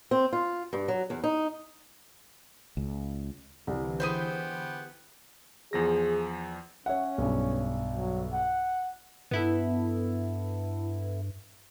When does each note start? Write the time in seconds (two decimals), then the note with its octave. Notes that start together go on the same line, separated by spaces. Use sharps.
0.11 C4
0.33 F4
0.73 G2
0.88 F#3
1.10 E2
1.24 D#4
2.77 C#2
3.67 C2 D3 E3
4.00 B3 G4 G#4 B4 C5 G6 D#7
5.73 E2 F3 G#4 A#6
6.86 C#4 C#5 E5 F#5
7.18 B1 G2
7.93 F#3
8.33 F#5
9.31 G2 B3 E4 A4